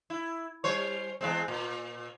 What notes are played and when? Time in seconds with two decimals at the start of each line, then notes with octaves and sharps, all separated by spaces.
0.10 E4
0.64 G3 C5 C#5
1.21 E2 G#3 C4
1.48 A#2